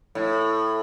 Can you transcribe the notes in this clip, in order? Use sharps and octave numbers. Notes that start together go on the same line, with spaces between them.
A2